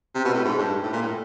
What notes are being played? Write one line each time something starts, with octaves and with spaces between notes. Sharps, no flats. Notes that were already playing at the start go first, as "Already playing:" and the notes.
C3
B2
A2
G#2
G2
A2
A#2
A2